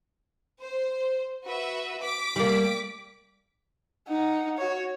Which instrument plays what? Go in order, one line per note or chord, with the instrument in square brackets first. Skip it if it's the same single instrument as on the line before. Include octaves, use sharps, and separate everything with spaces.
[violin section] C5
F#4 B4 E5
D6 B6
[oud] G3 A#3
[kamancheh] D#4 F#5
F#4 C#5